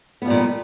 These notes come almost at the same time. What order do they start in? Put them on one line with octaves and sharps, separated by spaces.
B3 F2 G3 A#2 D#3